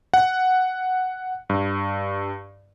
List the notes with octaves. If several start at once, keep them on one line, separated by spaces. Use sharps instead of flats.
F#5
G2